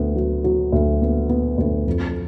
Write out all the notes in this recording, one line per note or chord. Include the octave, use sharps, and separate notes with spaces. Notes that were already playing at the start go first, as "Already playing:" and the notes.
Already playing: D2 B3
F#3
F#3
D2
B3
B3
D2
F2